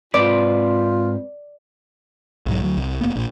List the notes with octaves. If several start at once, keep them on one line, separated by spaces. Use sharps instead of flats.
G#2 C4 F4 B4 D5
B1 G#2 F#3
D2 F#3
C2
F1 A#3 B3
A#1 A#2